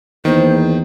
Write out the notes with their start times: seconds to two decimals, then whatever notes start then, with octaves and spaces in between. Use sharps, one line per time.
0.25 E2 D#3 A#3 B3 C5